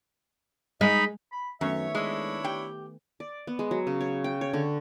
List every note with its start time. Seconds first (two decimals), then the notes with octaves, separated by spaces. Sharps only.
0.81 G#3 D#4 B5
1.32 B5
1.61 F#2 D#3 A3 B3 C#5 E5
1.95 G#3 D4 E4 C#5
2.44 G4 G5
3.20 D5
3.47 B3
3.59 G#3
3.71 F#3
3.87 C#3
4.01 C#5
4.24 G5
4.41 C#5
4.53 D3